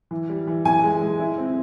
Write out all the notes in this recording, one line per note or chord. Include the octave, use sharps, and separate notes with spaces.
E3
G3
E3
E3 G#5
G#3
G#3
E4
C4